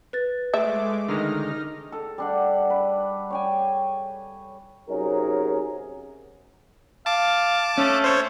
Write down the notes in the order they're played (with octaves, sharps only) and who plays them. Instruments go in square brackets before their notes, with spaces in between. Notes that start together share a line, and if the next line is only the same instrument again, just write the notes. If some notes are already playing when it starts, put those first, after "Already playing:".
[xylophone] B4 A6
[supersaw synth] G#3 A3 D6 [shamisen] E5
[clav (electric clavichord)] D3 D#3 G#3 [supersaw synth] D#4 F6 A#6
[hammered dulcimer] A4
G3 D4 F#5
B4
C#5 G5 G#5
[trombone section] C3 F#3 C#4 D#4 G#4 A#4
[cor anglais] F5 [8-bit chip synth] A5 D6
[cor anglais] A3 [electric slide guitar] C#4
[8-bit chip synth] C5 C#5